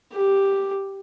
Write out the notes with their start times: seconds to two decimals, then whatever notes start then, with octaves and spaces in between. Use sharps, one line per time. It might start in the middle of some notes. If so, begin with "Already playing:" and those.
0.13 G4